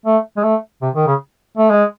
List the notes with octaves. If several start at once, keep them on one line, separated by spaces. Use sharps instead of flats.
A3
G#3
A3
C3
D#3
C#3
A3
G#3